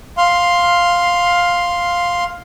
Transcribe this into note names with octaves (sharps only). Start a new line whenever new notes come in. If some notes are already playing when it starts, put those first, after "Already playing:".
F5 C6